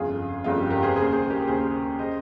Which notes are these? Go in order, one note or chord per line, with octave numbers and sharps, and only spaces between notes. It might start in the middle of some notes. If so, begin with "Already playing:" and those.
Already playing: G1 F2 C#3 F4 G#4
G1 F2 C#3 F4
G4
G4 A#4
G#4 C5
D#2 C#3 G#4 C5
G#4 C5
G4 A#4
D#2 C#3 G#4 C5
C#3 C5 D#5